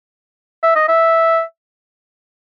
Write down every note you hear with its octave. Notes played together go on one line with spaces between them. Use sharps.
E5
D#5
E5